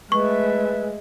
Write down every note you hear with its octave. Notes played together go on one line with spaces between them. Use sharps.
G#3 A3 B4 E5 C#6